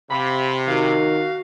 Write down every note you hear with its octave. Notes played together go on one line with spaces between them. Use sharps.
C3 F5 B5
D#3 F#4 F5